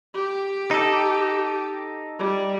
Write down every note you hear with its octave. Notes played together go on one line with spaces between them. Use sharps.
G4
D#4 A4
G3